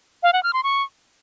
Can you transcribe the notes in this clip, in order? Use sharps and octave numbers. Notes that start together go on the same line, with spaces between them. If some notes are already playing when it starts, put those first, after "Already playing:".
F5
F#5
F6
C6
C#6